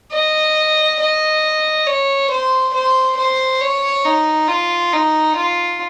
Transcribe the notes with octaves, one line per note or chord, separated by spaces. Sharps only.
D#5
D#5
C#5
C5
C5
C5
C#5
D#4
F4
D#4
F4